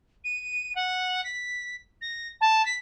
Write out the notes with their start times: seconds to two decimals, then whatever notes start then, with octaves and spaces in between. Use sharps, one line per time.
0.24 D#7
0.75 F#5
1.24 B6
2.01 A#6
2.41 A5
2.65 B6